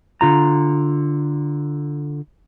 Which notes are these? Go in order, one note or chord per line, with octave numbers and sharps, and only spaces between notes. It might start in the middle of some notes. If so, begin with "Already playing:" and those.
D3 F4 A#5